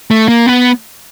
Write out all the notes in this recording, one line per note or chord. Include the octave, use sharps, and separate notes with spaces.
A3
A#3
B3